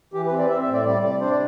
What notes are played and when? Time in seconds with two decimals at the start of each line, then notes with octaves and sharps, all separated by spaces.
0.13 E3 G4
0.26 B4
0.31 C4
0.38 D5
0.49 C4 E5
0.61 E5
0.67 A2
0.73 D5
0.85 G3 D5
1.03 C3 D5
1.21 D4 C5
1.30 D5